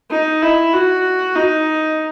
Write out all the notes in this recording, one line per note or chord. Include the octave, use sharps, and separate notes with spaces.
D#4
E4
F#4
D#4